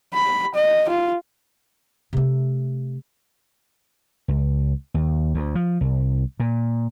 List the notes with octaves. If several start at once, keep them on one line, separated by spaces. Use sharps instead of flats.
B5
D#5
F4
C3 A3
C#2
D#2
D2
F3
C2
A#2